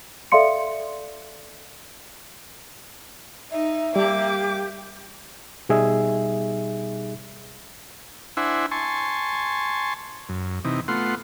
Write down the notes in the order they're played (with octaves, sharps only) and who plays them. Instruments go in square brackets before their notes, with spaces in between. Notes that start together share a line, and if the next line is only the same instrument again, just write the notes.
[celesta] A4 D5 E5 F5 C6 C#7
[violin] D#4 [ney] E5
[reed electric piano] G3 [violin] A#3 D6 [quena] G4
[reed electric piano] B2 G3 D#4 G#4 E5
[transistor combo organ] D4 E4 C5 E5 F#5 G#5
G#5 A5 C6 C#6
F#2
C3 E3 D#4
A3 B3 F4 F#5 C6